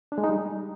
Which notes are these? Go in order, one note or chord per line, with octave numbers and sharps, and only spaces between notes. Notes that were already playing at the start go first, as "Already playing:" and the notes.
D4
G#3
D#4
G3